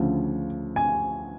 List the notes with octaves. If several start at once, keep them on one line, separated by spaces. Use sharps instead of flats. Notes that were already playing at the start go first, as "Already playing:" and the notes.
Already playing: D2 C#3 F3
G#5